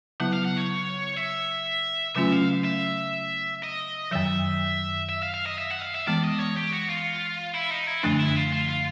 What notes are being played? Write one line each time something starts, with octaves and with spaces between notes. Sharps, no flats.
C#3 F#3 B3 E4 F#5
F5
F#5
C#5
E5
C#3 F#3 A3 C#4 F4 E5
F5
E5
D#5
F#2 D#3 F#3 E5
E5
F5
F5
D#5
E5
F#5
F5
E5
E3 G#3 B3 D5
D#5
C#5
G4
F#4
F4
E4
D#4
E4
F#2 D3 F3 A3 D4 F4
E4
F4
F4
F4